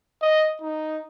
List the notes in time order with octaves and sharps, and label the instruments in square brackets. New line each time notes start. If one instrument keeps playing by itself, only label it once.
[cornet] D#5
D#4